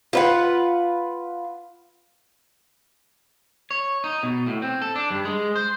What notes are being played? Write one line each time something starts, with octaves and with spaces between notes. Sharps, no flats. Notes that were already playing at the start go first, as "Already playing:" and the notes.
F4 B4 F#5
C#5
D#4
B2
A2
C4
A4
D4
G2
G#3
C5